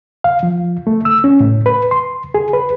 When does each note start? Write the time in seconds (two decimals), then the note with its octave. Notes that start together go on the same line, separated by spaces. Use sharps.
0.24 F5
0.43 F3
0.87 A3
1.05 E6
1.24 C#4
1.40 A2
1.66 B4
1.91 C6
2.34 G#4
2.53 B4